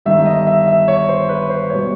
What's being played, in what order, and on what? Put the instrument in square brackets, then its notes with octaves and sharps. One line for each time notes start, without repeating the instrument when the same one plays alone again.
[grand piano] G1 G2 D#3 G3 E5
D#5
E5
E5
C#5
C5
B4
C5
B2 G3 C#5